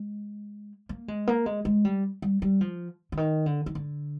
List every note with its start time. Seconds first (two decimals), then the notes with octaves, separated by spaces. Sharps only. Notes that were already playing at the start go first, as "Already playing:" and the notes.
Already playing: G#3
0.89 A#3
1.08 G#3
1.27 A#3
1.46 G#3
1.65 G#3
1.85 G3
2.22 G3
2.42 G3
2.61 F3
3.12 D3
3.17 D#3
3.46 D3
3.66 D#3
3.75 D3